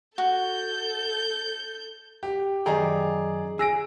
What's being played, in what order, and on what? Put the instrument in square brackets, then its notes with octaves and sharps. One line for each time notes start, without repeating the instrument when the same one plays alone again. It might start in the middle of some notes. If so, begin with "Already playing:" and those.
[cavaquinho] F#4 [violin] A4 G6
[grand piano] G4
[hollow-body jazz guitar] F#2 D#3 G5 [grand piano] G#4 D5 A#5
[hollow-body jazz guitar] G#4 [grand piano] E6 A#6 D7